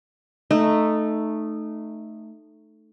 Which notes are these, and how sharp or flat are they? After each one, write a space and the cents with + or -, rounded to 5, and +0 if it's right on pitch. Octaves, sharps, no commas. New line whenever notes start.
A3 +0 D#4 -15